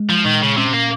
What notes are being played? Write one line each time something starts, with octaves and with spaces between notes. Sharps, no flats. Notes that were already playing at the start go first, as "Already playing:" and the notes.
Already playing: G#3
F3
A#2 D#3
C#3
C3 C#4
A#3